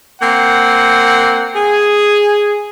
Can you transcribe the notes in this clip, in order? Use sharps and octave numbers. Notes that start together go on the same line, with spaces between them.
A#3 C4 F#5
G#4